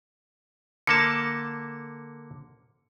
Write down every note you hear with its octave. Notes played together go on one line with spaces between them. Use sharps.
D3 A#3 A5 C#7